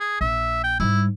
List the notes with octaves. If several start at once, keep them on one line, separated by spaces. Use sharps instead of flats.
G#4
A#1 E5
G5
G#2 G3 E4